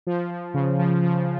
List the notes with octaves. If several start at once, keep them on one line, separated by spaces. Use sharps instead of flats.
F3
F3
C#3
F3
F3